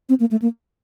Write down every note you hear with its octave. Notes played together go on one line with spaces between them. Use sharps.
C4
A#3
A3
A#3